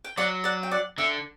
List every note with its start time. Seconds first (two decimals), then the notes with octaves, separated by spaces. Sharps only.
0.05 G5
0.17 F#3 D5 F#5
0.44 D5 F#5
0.63 G5
0.71 D5 F#5
0.98 D3 E5 G5